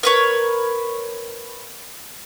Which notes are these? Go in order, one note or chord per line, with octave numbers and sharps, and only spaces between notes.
A#4 B4 C#5